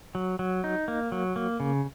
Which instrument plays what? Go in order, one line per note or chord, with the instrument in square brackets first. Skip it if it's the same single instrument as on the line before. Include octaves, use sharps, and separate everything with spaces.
[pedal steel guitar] F#3
F#3
D#4
A#3
F#3
A#3
C#3